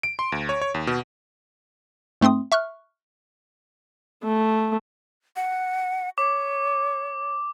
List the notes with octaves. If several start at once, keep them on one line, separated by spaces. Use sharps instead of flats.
D7
C6
D2
C#5
C#5
D#2
B2
G#2 A3 C4 C6 D#6
E5 C#6 F6 F#6
A3
F#5
C#5 D6